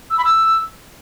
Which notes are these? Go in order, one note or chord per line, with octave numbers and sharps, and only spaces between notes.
E6
B5
E6